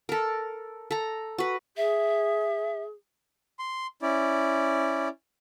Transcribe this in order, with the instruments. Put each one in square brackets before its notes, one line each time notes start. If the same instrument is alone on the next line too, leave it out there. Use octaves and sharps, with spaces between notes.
[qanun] A4 A#4
A4 A#5
F#4 B4
[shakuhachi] G#4 [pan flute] E5
[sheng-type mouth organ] C6
C#4 E4 D5